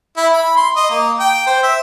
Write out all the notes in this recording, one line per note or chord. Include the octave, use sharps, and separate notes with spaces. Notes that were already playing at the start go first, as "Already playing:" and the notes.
E4
B5
C6
D#5
A#3
G5
C5
E5